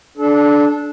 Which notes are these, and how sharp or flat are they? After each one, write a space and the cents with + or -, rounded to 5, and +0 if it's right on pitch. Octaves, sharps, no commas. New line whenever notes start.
D4 -5 A4 -30